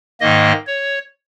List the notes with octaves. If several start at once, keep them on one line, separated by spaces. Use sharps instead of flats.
G#2 D#3 A#3 D#5
C#5